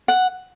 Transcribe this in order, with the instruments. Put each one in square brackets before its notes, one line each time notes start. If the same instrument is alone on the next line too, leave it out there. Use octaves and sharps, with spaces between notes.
[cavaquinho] F#5